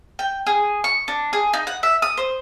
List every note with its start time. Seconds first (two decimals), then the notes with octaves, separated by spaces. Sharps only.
0.19 G5
0.47 G#4
0.84 C#6
1.08 D4
1.33 G#4
1.53 D#4
1.67 F#5
1.83 E5
2.02 D#6
2.17 C5